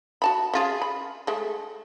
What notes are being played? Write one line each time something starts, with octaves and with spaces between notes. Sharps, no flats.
F#4 A5 B5
C#3 F4 G#4
B5
G#3 A3